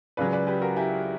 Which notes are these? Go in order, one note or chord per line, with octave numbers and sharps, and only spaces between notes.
C#2 C#3 F#3 B4 D5
B4 D5
G4 B4
F#4 A#4
E4 G4